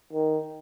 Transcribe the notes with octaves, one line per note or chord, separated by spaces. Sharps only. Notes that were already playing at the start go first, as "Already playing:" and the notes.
D#3